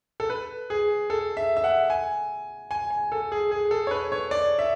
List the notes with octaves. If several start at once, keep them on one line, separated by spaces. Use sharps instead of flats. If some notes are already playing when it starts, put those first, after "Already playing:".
A4
B4
G#4
A4
E5
E5
F#5
G#5
G#5
G#5
A4
G#4
G#4
A4
C#5
B4
C#5
D5
E5